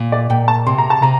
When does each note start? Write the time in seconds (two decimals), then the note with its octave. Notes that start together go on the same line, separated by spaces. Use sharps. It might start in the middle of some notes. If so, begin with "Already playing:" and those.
Already playing: A#2
0.12 D5
0.30 A#2 G5
0.48 A5
0.67 C3 C6
0.78 A#5
0.90 A5
1.02 C3 A#5